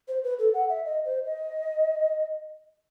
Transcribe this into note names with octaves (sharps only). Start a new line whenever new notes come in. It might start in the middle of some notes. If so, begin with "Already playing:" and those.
C5
B4
A4
F#5
E5
D#5
C5
D#5